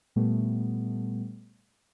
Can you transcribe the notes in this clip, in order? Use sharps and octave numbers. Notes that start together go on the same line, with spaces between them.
A#2 G3 A3 B3